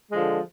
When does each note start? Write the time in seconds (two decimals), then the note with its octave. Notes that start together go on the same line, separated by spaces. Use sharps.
0.11 D3 F3 G#3